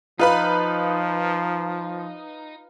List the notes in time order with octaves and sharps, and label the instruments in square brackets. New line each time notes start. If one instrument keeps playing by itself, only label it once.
[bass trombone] F3 [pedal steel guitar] D#4 [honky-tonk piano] F4 B4 B5